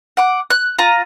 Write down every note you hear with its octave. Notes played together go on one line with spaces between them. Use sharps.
F#5 D6
F#6
F4 A#5